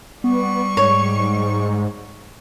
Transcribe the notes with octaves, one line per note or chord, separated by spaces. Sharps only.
G3 B3 C#6
G#2 C#5